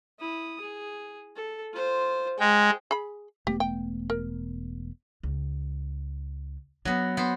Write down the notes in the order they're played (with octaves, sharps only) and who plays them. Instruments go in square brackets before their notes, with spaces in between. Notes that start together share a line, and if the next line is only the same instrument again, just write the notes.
[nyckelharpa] E4 D#6
G#4
A4
F4 C5
[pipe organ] G#3 [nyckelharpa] G5
[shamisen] G#4 B5
[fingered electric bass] E1 A3 B3 [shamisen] G4
[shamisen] G5
A#4
[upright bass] C#2
[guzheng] F#3 B3 [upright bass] D4
[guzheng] B3 C5